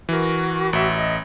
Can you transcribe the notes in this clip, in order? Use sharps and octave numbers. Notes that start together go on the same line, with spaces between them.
E3 F#4 A#4
A1 E5
D#5